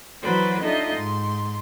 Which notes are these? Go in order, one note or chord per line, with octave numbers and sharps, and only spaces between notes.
E3 F#3 F#4 B4 C5 D5
D4 D#4 F4 A4 D#5 E5
G#2 C6